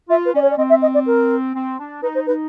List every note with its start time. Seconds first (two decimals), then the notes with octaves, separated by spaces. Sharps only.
0.09 F4 E5
0.26 B4
0.33 C#4 D5
0.42 C#5
0.51 D5
0.58 C4 D#5
0.70 E5
0.82 D#5
0.94 D5
1.06 A#4
1.55 C4
1.78 D4
2.02 D#4 B4
2.15 C5
2.27 D#4 B4